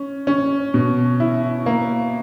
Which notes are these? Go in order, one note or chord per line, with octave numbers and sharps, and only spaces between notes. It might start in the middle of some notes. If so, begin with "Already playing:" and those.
Already playing: C#4
C#4
B2
E4
A#3